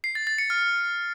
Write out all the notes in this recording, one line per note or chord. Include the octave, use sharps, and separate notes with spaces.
C7
A6
A6
C#7
F6